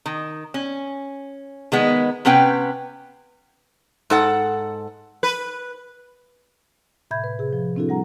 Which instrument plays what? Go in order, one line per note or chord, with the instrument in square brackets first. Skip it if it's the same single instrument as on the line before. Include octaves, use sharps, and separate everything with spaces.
[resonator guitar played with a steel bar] D#3
C#4
D#3 G#3 B3
C3 B3 C#4 B4 G5
G#2 A4 F#5
[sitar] B4
[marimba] A2 C3 E5 B5 G6 G#6
B4
C3 G#4
F3
C4 D4 E4 F#4 A4
G3 F#5 A#5